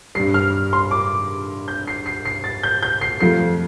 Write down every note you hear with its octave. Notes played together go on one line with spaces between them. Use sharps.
G2 G3 C7
F6
C6
D6
G6
C7
C7
C7
A6
G6
G6
C7
F2 F3 A3 C7